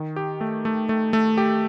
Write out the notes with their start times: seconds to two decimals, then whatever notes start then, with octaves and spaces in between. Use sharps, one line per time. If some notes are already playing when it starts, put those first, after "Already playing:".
Already playing: D#3
0.16 G4
0.41 A3
0.65 A3
0.89 A3
1.13 A3
1.38 G4